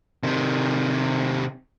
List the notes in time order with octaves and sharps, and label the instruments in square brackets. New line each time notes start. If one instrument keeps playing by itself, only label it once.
[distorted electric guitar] C3 D#3